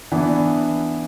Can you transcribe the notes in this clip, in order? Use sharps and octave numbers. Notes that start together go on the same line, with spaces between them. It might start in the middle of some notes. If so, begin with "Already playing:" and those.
E3 B3 D4